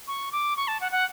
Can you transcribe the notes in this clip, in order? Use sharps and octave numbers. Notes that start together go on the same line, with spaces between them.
C#6
D6
C#6
A5
F#5
F#5